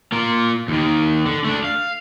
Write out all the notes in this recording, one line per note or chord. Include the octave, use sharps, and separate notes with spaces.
A#3 F4
D#2 D#3
D3
A3 D4
F5